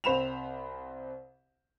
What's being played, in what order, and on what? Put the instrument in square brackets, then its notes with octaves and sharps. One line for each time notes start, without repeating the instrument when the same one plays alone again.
[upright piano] C2 C4 C5 B5 E7 F7